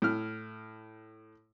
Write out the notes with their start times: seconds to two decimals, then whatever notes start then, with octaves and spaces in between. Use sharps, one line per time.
0.02 A2 F6